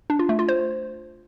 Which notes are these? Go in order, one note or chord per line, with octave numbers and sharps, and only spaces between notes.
D4
F4
A3
F4
C5